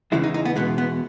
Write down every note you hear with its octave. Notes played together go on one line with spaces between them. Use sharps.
E2 C#3 E3 G#3 E4
D#4
D#4
B3
E2 B2 G#3 B3
B3